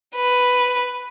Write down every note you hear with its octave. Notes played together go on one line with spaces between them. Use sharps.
B4